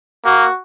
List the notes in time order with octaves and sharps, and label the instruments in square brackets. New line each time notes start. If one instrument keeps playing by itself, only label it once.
[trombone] A#3 [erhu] F#4